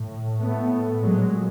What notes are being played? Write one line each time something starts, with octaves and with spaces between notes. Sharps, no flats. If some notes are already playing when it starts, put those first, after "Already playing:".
Already playing: A2
A3 B3
A#2 F#3 G#3